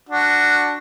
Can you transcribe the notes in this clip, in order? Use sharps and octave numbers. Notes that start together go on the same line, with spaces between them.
D4 F#4